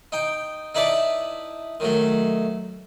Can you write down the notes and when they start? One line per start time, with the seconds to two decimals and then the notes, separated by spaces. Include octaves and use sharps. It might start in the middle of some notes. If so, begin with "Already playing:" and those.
0.12 D#4 G5
0.75 D#4 E4 B4 D5 A5
1.80 D#3 F#3 A3